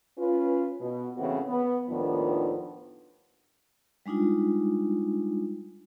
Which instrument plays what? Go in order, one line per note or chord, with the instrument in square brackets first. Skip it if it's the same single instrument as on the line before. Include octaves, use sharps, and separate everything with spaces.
[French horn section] C#4 F4 B4
B2
A2 C#3 E3 C4 F#4
B3
D#2 A2 D#3 F3 B3 D4
[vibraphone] G3 G#3 D4 D#4 F4